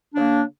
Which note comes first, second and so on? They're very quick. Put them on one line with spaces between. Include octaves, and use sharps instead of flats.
D4 C#3 A#3